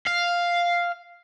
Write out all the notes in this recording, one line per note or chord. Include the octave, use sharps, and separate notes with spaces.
F5